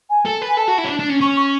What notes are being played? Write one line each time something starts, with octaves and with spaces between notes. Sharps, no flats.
G#5
A4
B4
G#5
A4 A5
F#4
E4
C#4
D4
D4
C#4
C#4 C#6
C#6